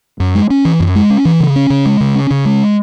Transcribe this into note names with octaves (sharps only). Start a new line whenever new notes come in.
F#2
G#3
C#4
E3
F#2
G#3
C#4
E3
C#3
C#4
C#3
G#3
C#3
C#4
C#3
G#3